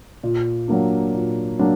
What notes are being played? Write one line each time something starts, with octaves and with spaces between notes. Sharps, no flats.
A#2
F#3 A#3 D4
A#2
F#3 A#3 D4